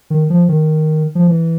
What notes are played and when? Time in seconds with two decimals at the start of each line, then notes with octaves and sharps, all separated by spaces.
0.10 D#3
0.30 F3
0.49 D#3
1.15 F3
1.27 E3